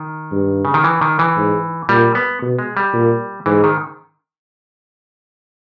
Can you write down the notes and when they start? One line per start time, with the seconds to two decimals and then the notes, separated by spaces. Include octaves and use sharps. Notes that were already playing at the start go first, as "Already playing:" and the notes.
Already playing: D#3
0.32 G2
0.65 C#3
0.74 D#3
0.84 E3
1.01 D#3
1.19 E3
1.36 G#2
1.89 A#2 G3
2.15 B3
2.42 B2
2.59 G#3
2.77 G3
2.93 A#2
3.46 G#2 E3
3.64 D#3